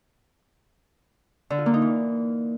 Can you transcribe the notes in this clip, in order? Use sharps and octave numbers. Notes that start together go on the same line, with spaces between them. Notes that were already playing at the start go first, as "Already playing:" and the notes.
D3
F4
A#3
D#4
E3